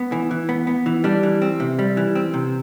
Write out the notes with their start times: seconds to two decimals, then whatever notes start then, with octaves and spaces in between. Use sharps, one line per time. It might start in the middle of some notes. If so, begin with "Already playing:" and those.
Already playing: B3
0.12 E3
0.31 E3
0.49 B3
0.67 B3
0.86 E3
1.04 G3 D4
1.23 E3
1.42 C4
1.60 C3
1.79 G3
1.97 E3
2.15 C4
2.34 C3